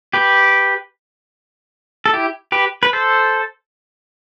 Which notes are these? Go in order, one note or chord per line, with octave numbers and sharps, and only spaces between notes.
G4 B4
A4
E4 G4
G4 B4
B4
A4 C5